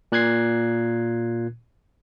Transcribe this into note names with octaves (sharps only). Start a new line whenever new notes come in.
A#2 F#6 G#6 C7